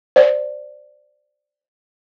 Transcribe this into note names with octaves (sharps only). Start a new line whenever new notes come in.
C5 D5